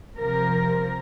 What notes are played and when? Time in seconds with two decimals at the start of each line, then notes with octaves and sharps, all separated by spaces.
0.16 C3 F3 A#4